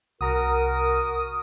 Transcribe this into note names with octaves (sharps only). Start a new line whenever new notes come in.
C2 F#4 A#4 A#5 D#6 A#6